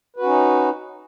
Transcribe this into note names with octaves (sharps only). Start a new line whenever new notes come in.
C#4 D#4 F#4 B4